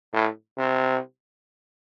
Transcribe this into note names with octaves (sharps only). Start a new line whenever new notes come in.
A2
C3